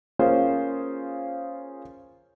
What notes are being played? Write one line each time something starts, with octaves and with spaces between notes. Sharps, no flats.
A#3 C#4 F4 G#4 C5